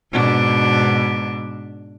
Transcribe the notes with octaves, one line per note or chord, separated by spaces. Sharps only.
G#2 B2 D4